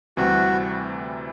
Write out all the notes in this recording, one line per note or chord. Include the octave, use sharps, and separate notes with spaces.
D2 C3 E3 G3 C4 F#4